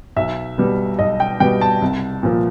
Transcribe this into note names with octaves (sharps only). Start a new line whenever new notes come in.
B1 E5
B2 G3
B1 D#5
G5
B2 G3 G5
A5
C2
A#2 F3